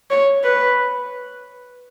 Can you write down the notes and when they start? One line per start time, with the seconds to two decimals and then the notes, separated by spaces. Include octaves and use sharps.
0.11 C#5
0.44 B4